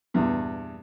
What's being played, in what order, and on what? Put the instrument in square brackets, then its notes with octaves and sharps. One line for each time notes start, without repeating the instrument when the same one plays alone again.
[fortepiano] E2 G2 A#2